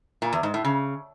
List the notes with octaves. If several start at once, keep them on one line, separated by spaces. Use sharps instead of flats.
A#2
E2
G#2
A2
C#3